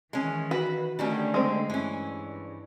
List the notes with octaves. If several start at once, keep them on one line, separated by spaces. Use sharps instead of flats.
D#3 E3 G#3 C#4
F#4 B4
D3 D#3 G3 A3 C#4
G#3 C4
G2 E3 C#4